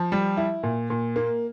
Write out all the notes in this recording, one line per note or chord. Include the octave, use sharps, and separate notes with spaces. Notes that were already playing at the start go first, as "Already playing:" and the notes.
Already playing: F3
G3
E4
A#2
A#2
A#3